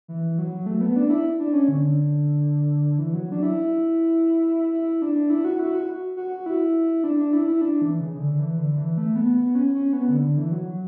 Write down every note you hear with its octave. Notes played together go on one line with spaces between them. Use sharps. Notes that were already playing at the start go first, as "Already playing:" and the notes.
E3
F#3
A3
B3
D4
E4
D4
C#4
D3
E3
F#3
D4
E4
E4
D4
E4
F#4
E4
F#4
F#4
E4
D4
D4
E4
E4
D4
E3
C#3
D3
E3
D3
E3
A3
B3
B3
C#4
C#4
B3
D3
D3
E3
F#3